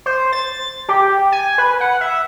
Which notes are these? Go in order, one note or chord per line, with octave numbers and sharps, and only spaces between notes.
C5
A6
G4
G#5
B4
F#5
E5